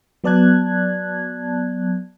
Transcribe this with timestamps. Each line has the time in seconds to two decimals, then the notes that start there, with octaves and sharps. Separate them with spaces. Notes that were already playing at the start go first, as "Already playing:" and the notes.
0.24 F#3 B3 D5 A5 F#6 G#6